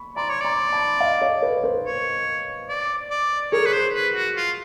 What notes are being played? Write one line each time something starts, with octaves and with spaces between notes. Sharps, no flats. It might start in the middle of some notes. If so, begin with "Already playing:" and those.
Already playing: B5 C#6
D5 A#5 C6
C#5
D5 A#5 C6
A5 B5
D#5 F5
C#5 D#5
B4 C#5
A#4 C5
C#5
D5
D5
G#4 A#4 C#5
B4
C5
B4
F#4
F4